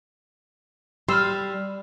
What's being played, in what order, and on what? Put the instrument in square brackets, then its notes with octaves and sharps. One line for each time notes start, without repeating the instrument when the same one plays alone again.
[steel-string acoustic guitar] G3 [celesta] B5 F6 [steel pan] C6 E6